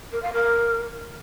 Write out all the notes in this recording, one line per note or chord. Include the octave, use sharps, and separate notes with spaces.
A#4
F5
A#4